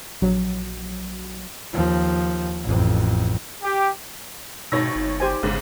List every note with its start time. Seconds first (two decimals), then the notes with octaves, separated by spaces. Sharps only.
0.22 A#1 F#3
1.73 D#2 F3
2.64 A1 F2
3.63 G4
4.72 G#1 B2 D#4 C#5 E6 A#6
4.95 G1
5.20 G4 C5 G#5
5.43 G1 G#2 C#3